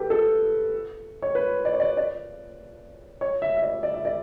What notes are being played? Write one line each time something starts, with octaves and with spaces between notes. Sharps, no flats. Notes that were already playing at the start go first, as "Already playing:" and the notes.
Already playing: G4 A4 B4
A4
C#5
B4
D5
C#5
D5
D5
C#5
E5
E5
D5
D5
E5
D5